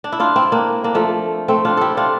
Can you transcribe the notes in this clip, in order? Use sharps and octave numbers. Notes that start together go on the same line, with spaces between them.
D4
E4
D4 F4
C4 E4
A#3 D4
A#3 D4
F3 A3
A3 C4
D4 F4
E4 G4 A4
D4 F4